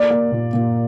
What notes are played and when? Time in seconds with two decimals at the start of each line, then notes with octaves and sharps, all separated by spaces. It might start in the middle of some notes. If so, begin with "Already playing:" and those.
Already playing: A#3 D5
0.10 A#3
0.32 A#2
0.53 A#2